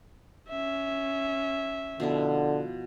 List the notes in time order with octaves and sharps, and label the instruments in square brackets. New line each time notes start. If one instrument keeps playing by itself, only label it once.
[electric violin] C#4 E5
[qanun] B2 F3 E4 [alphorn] D3